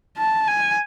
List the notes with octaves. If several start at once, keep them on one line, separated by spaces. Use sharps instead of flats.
A5
G#5